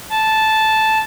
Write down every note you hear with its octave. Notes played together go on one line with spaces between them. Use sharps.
A5